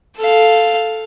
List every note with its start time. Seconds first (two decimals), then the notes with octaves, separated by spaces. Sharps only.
0.17 A4 F5